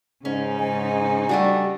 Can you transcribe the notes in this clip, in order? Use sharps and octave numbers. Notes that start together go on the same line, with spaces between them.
G#2 C#3 C#4 D#4
G#2 G#5
G3 A3 D4 F#4